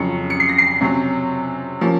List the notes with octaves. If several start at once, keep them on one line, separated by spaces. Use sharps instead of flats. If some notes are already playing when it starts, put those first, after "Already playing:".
Already playing: F2 C#3 F#3 C#7
C#7
C7
A#6
C7
C3 F#3 C#4
F3 A#3 C#4